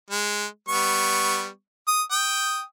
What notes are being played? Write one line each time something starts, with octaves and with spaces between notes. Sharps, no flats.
G#3
G3 B3 C#6
D#6
G5 D#6